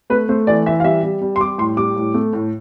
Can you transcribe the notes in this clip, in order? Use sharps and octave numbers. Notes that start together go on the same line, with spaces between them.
A3 B4
A3 C5
E3 D5
E3 E5
F5
G3 E5
G3
G3
C6
G3 D6
A2 C6
G3 D6
A2
A3
A2